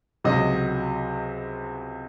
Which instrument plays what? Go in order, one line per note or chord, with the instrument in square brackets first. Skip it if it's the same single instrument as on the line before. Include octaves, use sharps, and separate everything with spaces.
[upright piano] C#2 C3 F#3 D#5